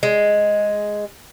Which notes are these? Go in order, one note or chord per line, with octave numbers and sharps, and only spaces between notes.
G#3